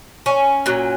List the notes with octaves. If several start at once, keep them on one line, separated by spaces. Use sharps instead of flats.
C#4
A#2 F#3